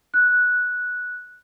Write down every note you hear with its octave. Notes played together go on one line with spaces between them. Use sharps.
F#6